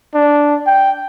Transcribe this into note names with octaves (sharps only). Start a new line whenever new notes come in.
D4
G5